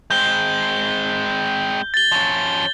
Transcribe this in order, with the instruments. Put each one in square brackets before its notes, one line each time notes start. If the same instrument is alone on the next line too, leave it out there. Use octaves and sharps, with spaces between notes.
[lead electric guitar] G#3 C4 [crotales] G6 G7
[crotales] A6 G7
[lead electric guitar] F3 C#4